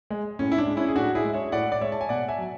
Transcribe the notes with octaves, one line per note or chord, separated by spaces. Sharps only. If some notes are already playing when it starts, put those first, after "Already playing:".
G#3
A2 C#4
E4
D4
G#3
C#4 E4
G#4
A2 D4 F#4
E4 G#4
G#3
C#5 E5
A2 D5 F#5
D5
G#3 C#5 E5
A5
G#5
B2 D5 F#5
E5 G#5
F#3